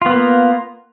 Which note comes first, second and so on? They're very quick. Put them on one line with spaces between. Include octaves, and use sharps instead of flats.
F4 B3 A#3